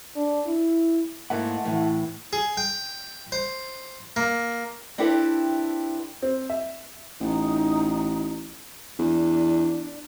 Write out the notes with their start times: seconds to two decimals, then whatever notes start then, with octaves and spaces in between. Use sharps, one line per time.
0.16 D4
0.47 E4
1.30 G#2 A3 A#3 E4 F#5
1.65 A2 E3
2.33 G#4
2.57 G5
3.32 C5
4.16 A#3
4.98 C4 D4 E4 G4 A4 B4
6.22 C4
6.50 E5
7.20 A1 D#4
8.99 E2 D4